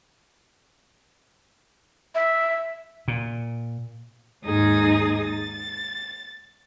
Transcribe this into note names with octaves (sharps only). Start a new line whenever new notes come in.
E5
A#2
D#2 G#2 D#4 G#4 D#6 A6
A6